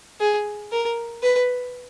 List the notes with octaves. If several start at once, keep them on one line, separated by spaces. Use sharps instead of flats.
G#4
A#4
B4